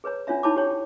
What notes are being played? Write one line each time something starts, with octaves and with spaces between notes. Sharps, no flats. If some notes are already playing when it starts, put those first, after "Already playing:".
G#4 B4 C#5 A#5
C#4 D4 F4 C#5 E5 A#5
D#4 E4 C#5 A5 B5 D6
G4 C#5 G5